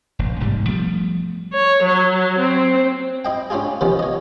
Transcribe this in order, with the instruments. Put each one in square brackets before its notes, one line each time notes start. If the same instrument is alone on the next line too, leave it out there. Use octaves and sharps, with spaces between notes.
[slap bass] F1 A#1
E1 G#2 C3 G3
F3 G3 A3 B3
[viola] C#5
F#3
C4
[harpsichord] E4 D#5 G5
C#4 D4 E4 F4 G#4
C3 D#3 F3 B3 C#4
C#5 D#5